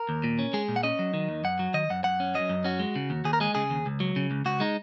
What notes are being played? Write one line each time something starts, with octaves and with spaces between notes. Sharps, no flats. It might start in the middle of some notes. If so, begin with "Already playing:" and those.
Already playing: A#4
D#2
A#2
C#4
G#3 G#4
A#2
F#5
C#4 D#5
F#3
D#3
D#2
F#2 F#5
F#3
D#3 D#5
F#2 F#5
F#2 F#5
C#4
F#3 D#5
F#2
C#4 F#4
G#3
C#3
D#2
D#2 G#4
A#4
G#3 G#4
C#3 G#4
D#2
C#2
F#3
C#3
C#2
C#2 F#4
G#3 D#4